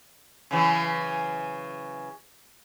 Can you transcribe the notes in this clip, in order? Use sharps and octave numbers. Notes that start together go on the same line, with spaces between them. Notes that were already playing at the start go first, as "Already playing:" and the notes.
C#3 E3 F#3